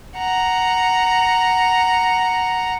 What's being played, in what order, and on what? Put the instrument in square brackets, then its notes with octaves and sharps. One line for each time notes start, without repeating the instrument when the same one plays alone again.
[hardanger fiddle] F#5 A#5